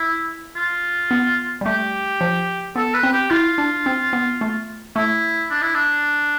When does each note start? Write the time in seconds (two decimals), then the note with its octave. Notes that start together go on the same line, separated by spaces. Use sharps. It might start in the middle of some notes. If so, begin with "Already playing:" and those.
Already playing: E4
0.56 F4
1.11 B3
1.61 G3
1.65 A3 G4
2.21 F3
2.76 B3 A4
2.94 B4
3.03 C4
3.12 G4
3.30 E4 F4
3.58 D4
3.86 C4
4.13 B3
4.41 A3
4.96 A3 E4
5.51 D4
5.62 E4
5.74 D4